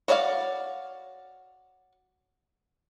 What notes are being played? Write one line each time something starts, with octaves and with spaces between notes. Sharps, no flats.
F#4 C#5 D5 E5 F5